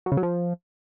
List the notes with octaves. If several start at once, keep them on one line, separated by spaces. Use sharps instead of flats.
F#3
C#3
F#3
F3